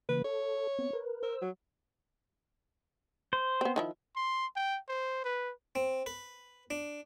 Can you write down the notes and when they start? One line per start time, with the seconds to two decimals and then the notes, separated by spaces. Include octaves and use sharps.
0.09 C#3 E3 A#3 B4
0.24 A4 C#5
0.79 B3 C4
0.93 A#4 B4
1.23 A#4 C5 E6
1.42 F#3
3.33 C5
3.61 B3 C4
3.76 D#3 F3 E4
4.16 C6
4.56 G5
4.88 C5
5.24 B4
5.75 C4
6.06 B4
6.70 D4